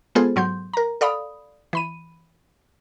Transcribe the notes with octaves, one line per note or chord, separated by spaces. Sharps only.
G#3 B3 F4 G#4 A4 C5
G#2 F#3 C6 G6
A#4 A#5
A4 D5 F5 B5 D#6
E3 B5 D#7